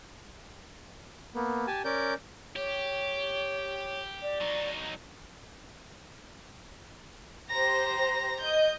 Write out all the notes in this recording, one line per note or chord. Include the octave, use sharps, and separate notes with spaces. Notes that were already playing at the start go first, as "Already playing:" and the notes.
A#3 B3
G4 G#5 A5
C#4 A#4 D5 G6
G4 C#5
D5
F#3 D#4
G4 C5 A#5 A#6
D#5 G6